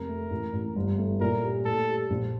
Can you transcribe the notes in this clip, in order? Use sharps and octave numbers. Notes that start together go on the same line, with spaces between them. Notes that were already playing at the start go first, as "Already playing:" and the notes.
Already playing: F1 F2 A#4
A3
A1
A1
G1
A3
A#2 A#4
G4
A2 A4
G4
A#1